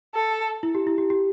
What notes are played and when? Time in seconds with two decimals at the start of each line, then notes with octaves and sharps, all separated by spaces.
0.15 A4
0.63 E4
0.75 G4
0.87 E4
0.98 G4
1.10 G4